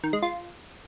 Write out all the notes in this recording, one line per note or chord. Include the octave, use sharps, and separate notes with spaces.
D#3
G#3
F4